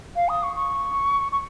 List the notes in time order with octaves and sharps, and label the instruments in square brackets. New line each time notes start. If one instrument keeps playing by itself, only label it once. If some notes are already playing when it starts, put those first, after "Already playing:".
[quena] F5
D#6
C#6
C#6
C#6